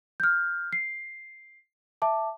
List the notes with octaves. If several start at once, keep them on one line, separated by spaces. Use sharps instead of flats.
F6 G6
C7
E5 A5 D6